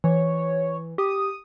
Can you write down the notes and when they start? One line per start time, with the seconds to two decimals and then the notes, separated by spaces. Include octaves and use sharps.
0.04 E3 C#5
0.98 G4 D#6